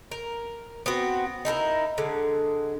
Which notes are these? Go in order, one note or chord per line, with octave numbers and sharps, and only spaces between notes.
A#4
B3 C4 F#4
D#4 E4 A4 A#4
D3 G#3